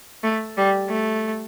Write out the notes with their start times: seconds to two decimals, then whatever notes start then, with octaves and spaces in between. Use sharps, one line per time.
0.23 A3
0.57 G3
0.89 A3